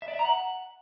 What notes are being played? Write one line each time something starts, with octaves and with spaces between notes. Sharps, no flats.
E5
D5
E5
A#5
F#5